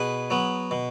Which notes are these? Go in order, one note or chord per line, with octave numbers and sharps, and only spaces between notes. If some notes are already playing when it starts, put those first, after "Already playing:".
Already playing: B2 G#4 B4
F#3 B3
B2